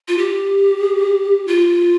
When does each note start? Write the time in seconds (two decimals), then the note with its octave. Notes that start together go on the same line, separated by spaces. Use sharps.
0.08 F4
0.18 G4
1.47 F4